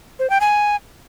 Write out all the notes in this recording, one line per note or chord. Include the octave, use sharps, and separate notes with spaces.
C5
G5
G#5